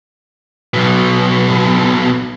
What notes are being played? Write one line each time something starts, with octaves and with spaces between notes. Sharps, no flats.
B1 B2